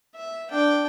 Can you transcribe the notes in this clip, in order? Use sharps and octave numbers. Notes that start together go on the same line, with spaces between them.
E5
D4 G5